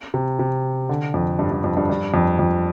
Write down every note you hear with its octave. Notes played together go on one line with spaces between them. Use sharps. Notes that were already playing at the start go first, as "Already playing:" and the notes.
C3
C3
D3
F2
G2
G2
F2
G2
G2
F2
F2